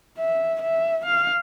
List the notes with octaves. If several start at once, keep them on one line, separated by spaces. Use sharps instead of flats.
E5
E5
F5